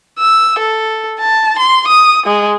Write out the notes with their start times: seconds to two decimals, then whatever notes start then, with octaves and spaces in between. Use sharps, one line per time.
0.19 E6
0.59 A4
1.20 A5
1.59 C6
1.88 D#6
2.26 G#3